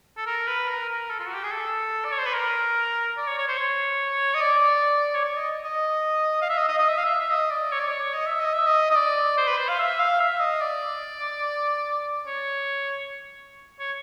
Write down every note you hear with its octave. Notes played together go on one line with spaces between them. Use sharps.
A4
A#4
B4
A#4
A#4
A4
F4
F#4
G4
G#4
A4
D5
C#5
C5
B4
A#4
D5
C#5
C#5
C5
C#5
D#5
D5
C#5
D5
D#5
D#5
F5
E5
D#5
D#5
D#5
E5
F5
E5
E5
D#5
D5
C#5
D5
C#5
D#5
E5
D#5
E5
D#5
D#5
D5
C5
B4
C5
F5
E5
F5
E5
D#5
D5
C#5
C#5